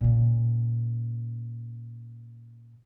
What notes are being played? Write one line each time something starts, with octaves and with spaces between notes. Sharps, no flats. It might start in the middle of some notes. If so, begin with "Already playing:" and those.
A#2 C#3